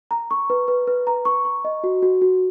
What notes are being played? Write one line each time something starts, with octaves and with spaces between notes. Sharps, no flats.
A#5
C#6
B4
B4
B4
A#5
C#6
C#6
D#5
F#4
F#4
F#4